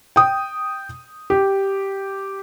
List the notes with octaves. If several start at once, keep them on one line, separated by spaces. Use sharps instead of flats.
G5 D#6
G4